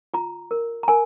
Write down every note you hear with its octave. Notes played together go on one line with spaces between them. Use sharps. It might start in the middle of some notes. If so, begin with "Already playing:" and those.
F4 A#5
A#4
A#5
A#4 G#5